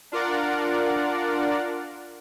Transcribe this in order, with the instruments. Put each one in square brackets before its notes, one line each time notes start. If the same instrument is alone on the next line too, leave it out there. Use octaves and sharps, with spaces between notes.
[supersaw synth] D4 F4 A#4 D5 F#5